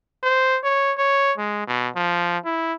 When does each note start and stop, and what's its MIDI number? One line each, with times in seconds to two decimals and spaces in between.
0.23 0.58 72
0.63 0.93 73
0.97 1.32 73
1.37 1.62 56
1.67 1.88 47
1.95 2.38 53
2.45 2.73 64